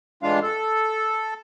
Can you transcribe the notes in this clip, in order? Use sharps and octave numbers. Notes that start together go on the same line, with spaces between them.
A2 E3 G#3 D4 F4 F5
A4